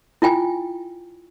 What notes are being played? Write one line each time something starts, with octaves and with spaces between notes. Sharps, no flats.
E4 F4 G5 G#5